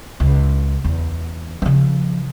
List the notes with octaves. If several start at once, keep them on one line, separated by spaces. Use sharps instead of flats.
C#2
E2
C#3 F3